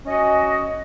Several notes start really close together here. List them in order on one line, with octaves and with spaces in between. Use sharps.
C#4 D#5 F#4